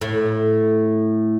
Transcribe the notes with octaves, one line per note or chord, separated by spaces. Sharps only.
A2